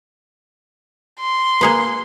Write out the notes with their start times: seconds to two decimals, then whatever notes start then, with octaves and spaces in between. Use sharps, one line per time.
1.20 C6
1.61 A#3 G#4 B4